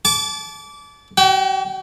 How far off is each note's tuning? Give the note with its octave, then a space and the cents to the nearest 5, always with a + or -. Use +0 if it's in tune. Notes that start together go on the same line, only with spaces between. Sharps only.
A5 -35 D6 -20
F#4 +45 G5 +0